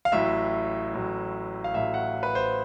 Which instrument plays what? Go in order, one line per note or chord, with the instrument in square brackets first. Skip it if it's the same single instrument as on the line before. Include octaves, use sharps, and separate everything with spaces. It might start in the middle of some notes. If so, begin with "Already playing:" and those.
[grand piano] F5
A1 A2 F#3 E5
A1 A2 F#3
F5
A1 A2 F#3 E5
F#5
B4
C5